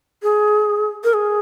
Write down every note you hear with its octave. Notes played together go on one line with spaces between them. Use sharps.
G#4
A#4
G#4